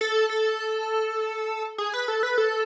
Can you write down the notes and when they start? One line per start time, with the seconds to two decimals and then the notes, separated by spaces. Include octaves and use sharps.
0.01 A4
0.29 A4
1.78 G#4
1.94 B4
2.08 A4
2.23 B4
2.38 A4